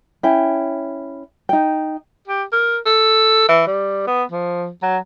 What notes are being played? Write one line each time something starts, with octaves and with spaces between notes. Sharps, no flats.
C#4 E4 G5
D#4 G5
G4
A#4
A4
E3
G3
B3
F3
F#3